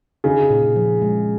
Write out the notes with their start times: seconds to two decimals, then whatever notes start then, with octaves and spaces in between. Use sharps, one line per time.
0.24 C#3 D#4
0.50 A#2
0.76 F3
1.02 G#3